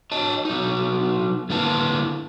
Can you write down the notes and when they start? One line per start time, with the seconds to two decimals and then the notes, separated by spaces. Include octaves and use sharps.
0.12 C#5 D#5 A5
0.45 F#3 D#4
1.50 D3 A#3 E4 B4 A5